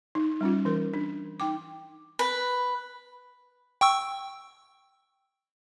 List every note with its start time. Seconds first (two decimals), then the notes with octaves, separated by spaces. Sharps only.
0.15 D#4
0.41 G3 C#4 F4
0.65 E3 A#4
0.94 D4
1.40 D#4 G5 D6
2.19 B4
3.81 G5 C#6 E6